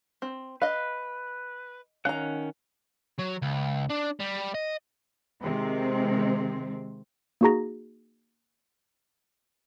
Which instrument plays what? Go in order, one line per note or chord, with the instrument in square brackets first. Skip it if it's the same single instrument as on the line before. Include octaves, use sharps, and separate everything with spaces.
[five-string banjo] C4
[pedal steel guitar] B4 [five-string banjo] D#5 F5
[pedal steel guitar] D#3 C#4 F#5 [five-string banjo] F5 A#5
[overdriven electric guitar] F#3
C#2
D4
G3
D#5
[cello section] C3 D#3 G#3 C4
[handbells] A#3 D#4 F#4 G#4 A#5 A#6